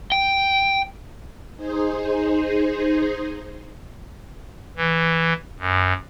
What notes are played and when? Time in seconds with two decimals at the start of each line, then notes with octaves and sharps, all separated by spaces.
0.12 G5
1.57 D#4 G#4 C5
4.77 E3
5.59 F#2